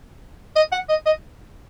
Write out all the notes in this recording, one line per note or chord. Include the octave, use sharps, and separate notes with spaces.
D#5
F#5
D#5
D#5